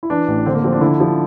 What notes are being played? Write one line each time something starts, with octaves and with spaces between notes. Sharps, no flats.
E4
E3 D4
A1
D3 C4
A#3
F3 C4
D4
D3 E4
F3